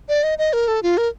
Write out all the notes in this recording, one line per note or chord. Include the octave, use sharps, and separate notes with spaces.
D5
D#5
D#5
A#4
A4
F4
A#4